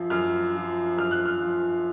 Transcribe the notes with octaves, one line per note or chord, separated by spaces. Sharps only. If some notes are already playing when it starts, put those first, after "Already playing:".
Already playing: F#2 F3
F#2 F6
F3
F#2 F6
F#6
F6
F3